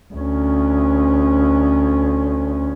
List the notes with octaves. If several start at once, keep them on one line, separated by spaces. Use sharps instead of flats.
D2 C#4